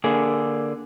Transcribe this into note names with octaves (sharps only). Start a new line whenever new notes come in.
D3 A#3 G#4